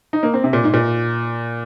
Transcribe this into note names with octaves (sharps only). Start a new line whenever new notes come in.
D#4
A#3
C4
C3
A#2
G#2
A#2